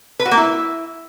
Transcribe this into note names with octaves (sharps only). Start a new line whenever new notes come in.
B4
F#4
A#3
E4